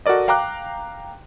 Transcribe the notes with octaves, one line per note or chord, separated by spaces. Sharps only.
F#4 A4 A#4 D5 D#5
F5 G5 A#5 D6 F#6